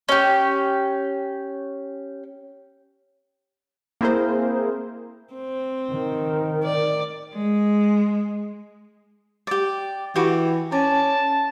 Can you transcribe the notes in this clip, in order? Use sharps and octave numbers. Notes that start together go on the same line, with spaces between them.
C#4 G4
A#3 C4 E4 G#4 A#4 C5
C4
D#3
D5
G#3
G4 D5
E3 F#4 G4
C#4 D5 A5